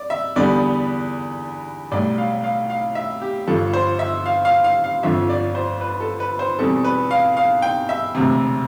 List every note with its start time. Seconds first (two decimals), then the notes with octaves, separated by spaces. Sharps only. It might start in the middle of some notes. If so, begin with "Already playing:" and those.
Already playing: D5
0.10 E5
0.36 E2 D3 G3 B3 D5
1.92 B1 A2 G3 D5
2.18 F5
2.44 F5
2.70 F5
2.95 E5
3.22 G4
3.47 G1 G2 F3 A4
3.73 C5
3.99 E5
4.26 F5
4.45 F5
4.64 F5
4.84 F5
5.03 G1 F2 D3 F3 E5
5.29 D5
5.55 C5
5.81 B4
6.00 A4
6.20 B4
6.39 C5
6.59 E2 B2 G3 C4 A4
6.84 B4
7.11 F5
7.37 F5
7.62 G5
7.89 E5
8.15 E1 D2 C3